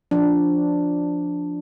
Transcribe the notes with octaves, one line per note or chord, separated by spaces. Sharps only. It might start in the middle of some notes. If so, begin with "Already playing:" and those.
F3 D4